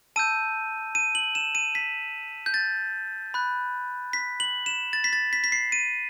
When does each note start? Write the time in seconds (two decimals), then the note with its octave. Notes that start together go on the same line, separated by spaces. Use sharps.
0.16 A5 E6 G6 D#7
0.95 D#7
1.15 F#7
1.35 E7
1.55 D#7
1.75 B6
2.46 G6
2.54 A6
3.34 B5 F#6
4.13 B6
4.40 F#7
4.66 E7
4.93 A6
5.04 B6
5.13 A6
5.33 B6
5.44 B6
5.52 C7
5.72 D#7